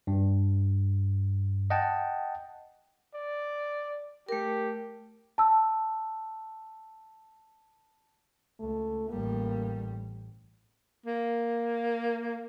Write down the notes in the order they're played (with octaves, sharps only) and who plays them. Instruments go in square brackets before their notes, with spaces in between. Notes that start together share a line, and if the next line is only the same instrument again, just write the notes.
[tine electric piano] G2
D#5 F#5 G5 A5
[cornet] D5
[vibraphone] A3 A#4 [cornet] G4
[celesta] A5 E6
[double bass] C#2 [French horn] A3
[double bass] A1 G3 [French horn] A#3
[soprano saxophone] A#3